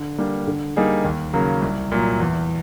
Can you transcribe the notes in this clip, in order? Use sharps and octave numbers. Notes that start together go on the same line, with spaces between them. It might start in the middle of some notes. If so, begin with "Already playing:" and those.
Already playing: D3
G3 A#3 D4
D3
G3 A#3 D#4 G#4
D#2
C#3 F#3 A#3
C2
A#2 F#3
E2